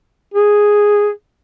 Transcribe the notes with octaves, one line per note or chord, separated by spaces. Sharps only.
G#4